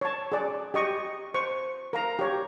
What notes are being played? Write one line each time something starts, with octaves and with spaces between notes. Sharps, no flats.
C#5 A5
G#4 D5
G4 D#5 C#6
C5 C#6
A#4 F5 A#5
G4 C#5